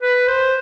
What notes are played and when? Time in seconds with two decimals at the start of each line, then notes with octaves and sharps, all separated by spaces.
0.02 B4
0.28 C5